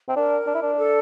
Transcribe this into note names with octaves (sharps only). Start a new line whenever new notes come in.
C4
D4 A#4
D4
E4
D4
A4